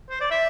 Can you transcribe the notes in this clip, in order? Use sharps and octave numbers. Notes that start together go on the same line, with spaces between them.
C5
D5
E5